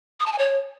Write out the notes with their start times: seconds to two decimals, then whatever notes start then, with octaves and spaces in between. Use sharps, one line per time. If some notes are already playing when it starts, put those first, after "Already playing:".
0.20 D#6
0.26 A5
0.32 G#5
0.38 C#5